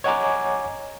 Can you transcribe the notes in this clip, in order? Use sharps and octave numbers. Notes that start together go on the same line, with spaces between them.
C#5 D#5 F#5 G#5 A#5 D6